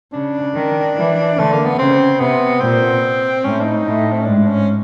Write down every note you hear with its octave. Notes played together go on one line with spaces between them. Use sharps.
C#3 D4
D#3
E3
D3 A3
A#3
B3
C#3 C4
C3 B3
A#2 C4
A2 C#4
D4
D#4
A2
C4
C#4
G#2 D4
C#4